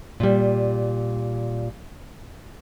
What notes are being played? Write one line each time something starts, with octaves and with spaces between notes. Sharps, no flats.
A#2 G3